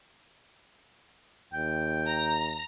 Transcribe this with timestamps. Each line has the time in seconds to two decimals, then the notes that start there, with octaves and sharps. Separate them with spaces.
1.53 D#2 G5
2.09 A#5